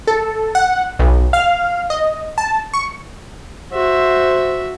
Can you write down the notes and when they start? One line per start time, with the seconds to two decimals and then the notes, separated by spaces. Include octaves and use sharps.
0.07 A4
0.55 F#5
0.99 B1
1.33 F5
1.90 D#5
2.38 A5
2.74 C#6
3.72 F#4 C5 E5